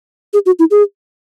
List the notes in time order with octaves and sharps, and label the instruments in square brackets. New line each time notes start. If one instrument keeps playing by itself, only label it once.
[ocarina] G#4
F#4
E4
G#4